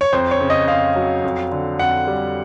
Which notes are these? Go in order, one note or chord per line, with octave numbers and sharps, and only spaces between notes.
C#5
F2 C5
C#5
C#3
D#5
F2 F5
F#3
F2
D3
F2 F#5
G3